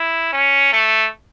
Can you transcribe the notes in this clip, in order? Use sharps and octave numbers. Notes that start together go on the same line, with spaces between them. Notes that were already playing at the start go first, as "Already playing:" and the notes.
Already playing: E4
C#4
A3